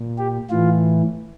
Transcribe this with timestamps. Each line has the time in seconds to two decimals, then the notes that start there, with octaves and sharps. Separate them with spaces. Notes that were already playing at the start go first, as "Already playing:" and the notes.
Already playing: A#2
0.18 G4
0.50 A2 E3 F4